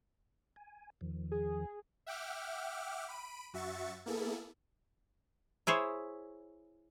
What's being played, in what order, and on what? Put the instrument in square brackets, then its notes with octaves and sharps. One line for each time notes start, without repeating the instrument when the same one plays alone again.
[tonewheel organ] G#5
E2 D#3 F3
[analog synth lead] G#4
[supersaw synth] E5 F#5 G5 D6 F6
B5 D7 D#7
F#2 F#4 E5 C#6 A6
A#3 B3 E4 G#4 A4
[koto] E4 G#4 C5 C#5